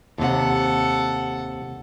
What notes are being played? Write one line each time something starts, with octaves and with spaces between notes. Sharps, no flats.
D#2 C3 A4 F#5